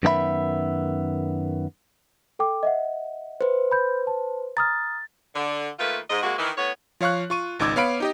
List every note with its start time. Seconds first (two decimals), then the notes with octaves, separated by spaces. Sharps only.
0.03 F#2 D#3 B3 D#4 E5 B5
2.39 A4 G5 D6
2.63 D#5 E5 F#5
3.41 B4 C5
3.71 B5 G6
4.07 A5
4.57 A#5 D#6 F6 A6
5.35 D3
5.79 D#3 A3 A#3 F4 B4
6.10 G#2 D#5
6.23 C3 G#3 A#3 F#4
6.39 D#3 E3
6.58 A2 B3 C#5
7.01 F3 C#5 F5 C#6 F#6
7.30 F4 C#6 D#7
7.59 G#1 C#2 D#4 D6 E6 G#6
7.76 B3 C#5 F5 B5 D7
8.00 D#4 G4 D#5